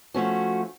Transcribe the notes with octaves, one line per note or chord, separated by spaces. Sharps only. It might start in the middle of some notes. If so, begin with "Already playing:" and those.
F3 A3 C#4 F#4